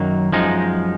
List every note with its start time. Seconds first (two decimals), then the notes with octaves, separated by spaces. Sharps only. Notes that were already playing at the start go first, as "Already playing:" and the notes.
Already playing: F#2 D#3 F#3 A#3 D#4
0.32 F#2 F3 G#3 D#4